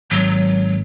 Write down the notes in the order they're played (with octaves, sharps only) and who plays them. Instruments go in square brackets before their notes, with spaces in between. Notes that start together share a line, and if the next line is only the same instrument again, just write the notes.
[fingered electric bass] G#1 [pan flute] F#3